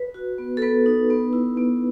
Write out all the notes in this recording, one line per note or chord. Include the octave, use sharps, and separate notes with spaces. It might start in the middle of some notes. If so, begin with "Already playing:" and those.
Already playing: B4
F#4
B3
A4
B3 B4
D#4
B3
E4
B3